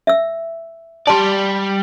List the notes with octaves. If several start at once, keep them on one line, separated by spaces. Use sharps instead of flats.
E5 E6
G3 D5 A5 C6